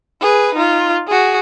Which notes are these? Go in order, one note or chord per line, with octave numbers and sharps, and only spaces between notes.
G#4 B4
D#4 F4
F#4 G#4